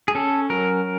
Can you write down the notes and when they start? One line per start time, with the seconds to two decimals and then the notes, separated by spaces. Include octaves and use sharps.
0.08 G#4
0.15 C#4 A4
0.50 F#3 A#4